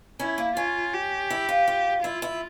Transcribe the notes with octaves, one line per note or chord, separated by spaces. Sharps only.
C#4 E4
A#3
C#4 F4
G4
E4
F4
F4
E4 F4
E4